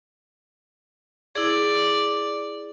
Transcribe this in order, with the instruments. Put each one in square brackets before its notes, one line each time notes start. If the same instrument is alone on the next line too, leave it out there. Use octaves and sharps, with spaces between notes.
[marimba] E4 G#4 [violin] D5